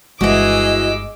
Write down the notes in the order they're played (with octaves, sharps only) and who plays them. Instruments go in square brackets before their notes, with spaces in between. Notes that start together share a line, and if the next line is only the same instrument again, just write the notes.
[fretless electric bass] G1 G#3 [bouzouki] E3 F#4 [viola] G#4 D#5 [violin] D6 E6